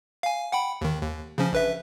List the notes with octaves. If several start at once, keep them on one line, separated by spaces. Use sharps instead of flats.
F5 G#5
F#5 G5 B5
D#2 D#3
D#2
C#3 F3 C#4
A#1 B4 E5